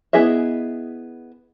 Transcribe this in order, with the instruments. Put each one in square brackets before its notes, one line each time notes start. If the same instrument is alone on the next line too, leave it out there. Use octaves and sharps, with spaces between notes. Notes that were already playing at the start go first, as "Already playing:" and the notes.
[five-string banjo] B3 E4 G#4 D#5 E5